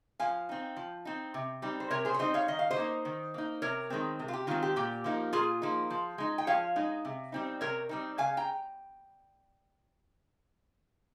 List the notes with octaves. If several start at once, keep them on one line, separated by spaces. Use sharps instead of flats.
F3 F5 G#5
C4 D#4
F3
C4 D#4
C3
G3 C4 D#4
C5
C3 A#4 C#5
G#4 C5
C#5
G3 C4 D#4 C5 D#5
C#5 F5
D#3 D#5
F5
C5 D#5
A#3 D#4
D#3
A#3 D#4
C3 A#4 C#5
D#3 G#3 C4
C3
F4
G4
D#3 G#3 C4 F4
G4
A#2 G4
F3 A#3 D#4
A#2 F4 G#4
F3 A#3 D#4
F3
G#3 D#4
G5
F3 C#5 F5
G#3 D#4
C3
G3 C4 D#4
C3 A#4 C#5
G3 C4 D#4
C#3 F5 G#5
G5 A#5